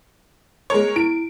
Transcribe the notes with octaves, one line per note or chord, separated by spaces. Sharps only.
G#3 A#4 C#5
E4 D7